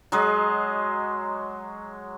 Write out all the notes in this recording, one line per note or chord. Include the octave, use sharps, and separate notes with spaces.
F#3 G#3 D#5